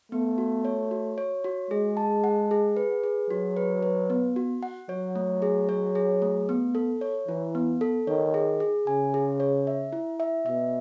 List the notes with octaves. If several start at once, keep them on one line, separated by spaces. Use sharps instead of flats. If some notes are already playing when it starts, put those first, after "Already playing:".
A3 B3
F#4
C#5
F#4
C#5
F#4
G#3 G#4
A5
F#5
G#4
B4
G#4
F#3 F#4
B4
B4
B3
F#4
F#5
F#3 C#5
A3
G#4
C#5
G#4
A3
B3
A4
C#5
E3 E4
B3
A4
D#3 C#5
G#4
G#4
C#3 G#5
G#4
C#5
E5
E4
E5
B2 E5